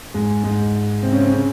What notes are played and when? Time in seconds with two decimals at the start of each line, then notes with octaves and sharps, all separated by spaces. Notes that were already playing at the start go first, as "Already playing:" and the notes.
0.14 G#2 G#3
0.43 G#2 G#3
1.02 C3 C4
1.12 C#3 C#4
1.22 C3 C4
1.32 C#3